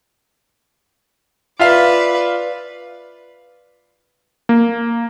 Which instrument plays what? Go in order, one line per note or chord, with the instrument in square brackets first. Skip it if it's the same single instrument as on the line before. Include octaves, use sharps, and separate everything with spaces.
[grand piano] F4 E5 F5 [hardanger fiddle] B4 D5
[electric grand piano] A#3